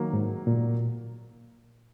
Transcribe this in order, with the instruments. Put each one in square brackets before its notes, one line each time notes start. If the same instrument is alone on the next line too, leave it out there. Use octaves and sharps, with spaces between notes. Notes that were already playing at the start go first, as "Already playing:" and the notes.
Already playing: [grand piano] D#3 F#3 A#3
[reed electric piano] G#2
A#2